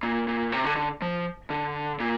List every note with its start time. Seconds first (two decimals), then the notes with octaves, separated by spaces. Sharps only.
0.03 A#2
0.28 A#2
0.52 C3
0.64 D3
0.76 D3
1.02 F3
1.50 D3
2.00 A#2